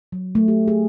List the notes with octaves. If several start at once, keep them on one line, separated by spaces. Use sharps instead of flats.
F#3
A3
G4
G#4